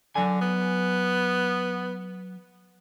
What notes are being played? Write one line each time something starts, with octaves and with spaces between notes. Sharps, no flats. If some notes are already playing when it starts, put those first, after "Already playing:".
D3 F#3 G#5
B3